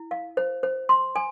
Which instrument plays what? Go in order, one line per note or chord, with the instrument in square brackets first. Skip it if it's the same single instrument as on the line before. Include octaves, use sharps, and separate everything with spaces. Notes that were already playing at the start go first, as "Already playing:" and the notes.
Already playing: [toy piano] E4
F5
C5
C5
C6
G#5